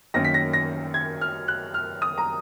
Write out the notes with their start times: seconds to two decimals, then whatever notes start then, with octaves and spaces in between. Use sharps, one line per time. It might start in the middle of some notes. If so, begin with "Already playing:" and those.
0.14 F#2 D#3 A#3 C#4 A#6
0.25 B6
0.34 A#6
0.53 A#6
0.94 G#6
1.21 F6
1.48 F#6
1.74 F6
2.02 D#6
2.18 A#5